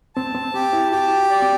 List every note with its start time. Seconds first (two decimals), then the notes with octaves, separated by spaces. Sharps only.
0.15 C4 A5
0.35 C4
0.54 C4 G4
0.73 E4
0.92 F#4 G4
1.17 F#4
1.30 D5
1.42 C4